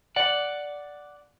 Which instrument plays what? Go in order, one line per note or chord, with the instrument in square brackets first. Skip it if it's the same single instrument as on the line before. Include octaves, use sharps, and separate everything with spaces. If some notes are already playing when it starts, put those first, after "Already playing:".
[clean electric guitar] D5 F#5